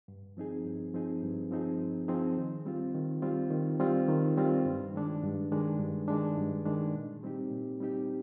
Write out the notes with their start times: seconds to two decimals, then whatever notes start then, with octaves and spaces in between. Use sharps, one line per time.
0.08 G2
0.37 F3 C4 D#4 G#4
0.65 G2
0.94 F3 C4 D#4 G#4
1.22 G2
1.51 F3 C4 D#4 G#4
1.79 G2
2.08 F3 C4 D#4 G#4
2.36 D#3
2.65 G3 C4 F4
2.95 D#3
3.22 G3 C4 F4
3.51 D#3
3.80 G3 C4 F4
4.08 D#3
4.37 G3 C4 F4
4.65 G2
4.94 D#3 G#3 D4
5.23 G2
5.52 D#3 G#3 D4
5.80 G2
6.08 D#3 G#3 D4
6.38 G2
6.65 D#3 G#3 D4
6.95 A#2
7.23 G3 C4 D#4 G4
7.51 A#2
7.80 G3 C4 D#4 G4